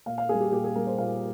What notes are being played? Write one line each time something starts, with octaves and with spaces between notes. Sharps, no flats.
A#2 F5
F5
G3 A#3 G#4
G4
A#2 G4
G#4
G3 A#3 A#4
C5
A#2 F5